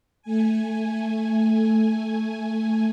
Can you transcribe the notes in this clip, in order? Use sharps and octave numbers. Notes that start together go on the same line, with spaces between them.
A3 G#5